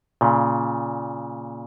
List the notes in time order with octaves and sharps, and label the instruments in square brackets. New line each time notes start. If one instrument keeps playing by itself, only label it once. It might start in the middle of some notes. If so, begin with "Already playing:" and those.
[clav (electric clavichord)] A#2 C#3